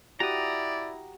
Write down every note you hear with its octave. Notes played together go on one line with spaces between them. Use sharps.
E4 F#4 G4 D5 A#5 D#6